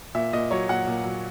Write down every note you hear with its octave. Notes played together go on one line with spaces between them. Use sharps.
A#2 E5
A#2 D#5
F#3 C#5
A#2 F#5
A#2
F#3